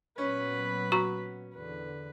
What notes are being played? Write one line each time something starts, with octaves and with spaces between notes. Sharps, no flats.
A#2 F#3 B3 C#4 B4 B5
F#4 A#5 C#6
E2 D3 B4